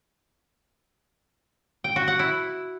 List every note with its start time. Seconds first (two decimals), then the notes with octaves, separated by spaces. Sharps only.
1.84 G5
1.96 F#4
2.08 F#5
2.19 E4